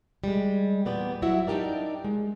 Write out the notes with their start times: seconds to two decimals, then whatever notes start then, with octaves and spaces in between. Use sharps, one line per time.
0.24 G3 G#3
0.85 E2 A#2 B3 D5 G5
1.22 F#3 E4 F#4 E5
1.47 D4 D#4 G4 A#4 D5
2.04 G#3